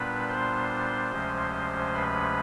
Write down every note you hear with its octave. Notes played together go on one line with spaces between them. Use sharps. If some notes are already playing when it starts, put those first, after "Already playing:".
Already playing: A#2 G3 B3 D4 B4 B5
C5 C6
D2 C3 F3 G#3 C#4
B4 B5